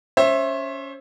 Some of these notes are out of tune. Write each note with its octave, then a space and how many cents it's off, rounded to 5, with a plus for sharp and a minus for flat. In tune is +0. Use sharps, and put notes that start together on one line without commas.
C#4 +15 C5 +35 E5 +0